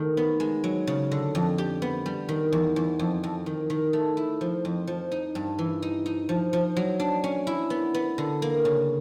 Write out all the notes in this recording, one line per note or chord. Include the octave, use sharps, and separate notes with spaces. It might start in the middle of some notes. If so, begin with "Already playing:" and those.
Already playing: D#3 A3
B3
G#3
F#3
C#3
D3
F2
G4
B3
G3
D#3
E2
E2
F2
F2
D#3
D#3
A3
E4
F3
F2
F3
D#4
G2
E3
D#4
D#4
F3
F3
F#3
D4
C#4
E4
B3
B3
D3
A#3
C#3